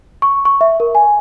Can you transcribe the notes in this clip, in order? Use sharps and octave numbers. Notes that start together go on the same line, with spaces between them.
C#6
C#6
E5
A#4
G#5